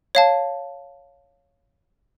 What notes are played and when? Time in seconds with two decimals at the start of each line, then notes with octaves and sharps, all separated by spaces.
0.15 C#5 F5 A5